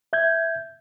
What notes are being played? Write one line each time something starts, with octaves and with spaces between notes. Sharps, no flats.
E5 G6 G#6